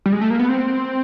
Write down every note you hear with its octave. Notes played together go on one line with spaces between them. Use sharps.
G3
G#3
A3
A#3
B3
C4